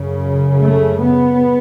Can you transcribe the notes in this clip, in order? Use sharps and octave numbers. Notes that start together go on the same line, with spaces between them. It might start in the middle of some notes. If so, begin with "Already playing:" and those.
Already playing: F#2 C#3
A3
B3